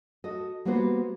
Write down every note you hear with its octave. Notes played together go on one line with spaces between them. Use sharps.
F#4 A4 D#5
G3 A#3 B3 F#4 B4 C5